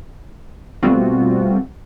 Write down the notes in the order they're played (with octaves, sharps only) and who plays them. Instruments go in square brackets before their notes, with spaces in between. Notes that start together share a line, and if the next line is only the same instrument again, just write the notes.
[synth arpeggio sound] B2 G3 A3 C4 F4 F#4